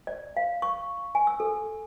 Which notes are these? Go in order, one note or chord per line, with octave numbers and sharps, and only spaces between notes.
D5
F5
C#6
G#5
E6
A4